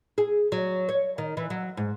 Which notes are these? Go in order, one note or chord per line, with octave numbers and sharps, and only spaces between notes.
G#4
F#3
C#5
D#3
E3
F#3
G#2